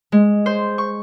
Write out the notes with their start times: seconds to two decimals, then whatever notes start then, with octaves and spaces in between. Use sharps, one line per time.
0.12 G#3
0.46 C5
0.78 C#6